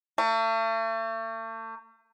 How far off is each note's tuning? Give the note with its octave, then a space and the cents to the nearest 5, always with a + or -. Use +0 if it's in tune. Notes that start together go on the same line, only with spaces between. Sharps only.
A3 +40